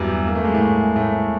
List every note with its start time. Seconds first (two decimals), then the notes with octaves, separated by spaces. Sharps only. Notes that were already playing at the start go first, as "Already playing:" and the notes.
Already playing: E2 G2 E3 F#3 G3
0.26 A#3
0.35 A3
0.44 G#3
0.53 A2 A3
0.96 A2 A3